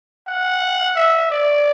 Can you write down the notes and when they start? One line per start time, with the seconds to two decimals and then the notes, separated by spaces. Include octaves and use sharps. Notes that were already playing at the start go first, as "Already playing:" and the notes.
0.27 F#5
0.95 E5
1.31 D5